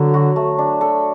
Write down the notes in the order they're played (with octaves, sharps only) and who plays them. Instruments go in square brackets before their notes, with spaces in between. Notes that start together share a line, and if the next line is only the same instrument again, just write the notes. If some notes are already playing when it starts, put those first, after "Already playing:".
Already playing: [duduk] D3 [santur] F#3 B3 C#5
[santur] F#4
A3
D4
A4